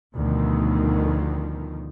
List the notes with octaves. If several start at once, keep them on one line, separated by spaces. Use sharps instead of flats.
D2 B2 D#3 F3